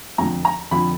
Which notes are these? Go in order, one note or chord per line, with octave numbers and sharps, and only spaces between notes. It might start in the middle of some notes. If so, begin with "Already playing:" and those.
F2 D3 F3 A#5
A#5
F2 D3 F3 B5